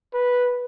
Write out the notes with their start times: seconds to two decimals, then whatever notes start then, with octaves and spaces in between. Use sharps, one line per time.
0.14 B4